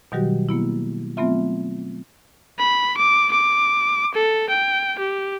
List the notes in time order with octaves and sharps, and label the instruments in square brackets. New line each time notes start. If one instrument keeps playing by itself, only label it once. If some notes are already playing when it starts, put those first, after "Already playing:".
[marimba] B2 D#3 F#3 G3 F#4 G4
A#3 B3 E4
F#3 A3 B3 C4 F4 E5
[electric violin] B5
D6
D6
A4
G5
G4